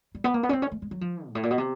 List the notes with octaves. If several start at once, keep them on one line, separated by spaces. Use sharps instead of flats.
G3
B3
A#3
B3
C#4
C4
C#4
A3
G#3
F#3
F3
G#2
A2
A#2
B2
C3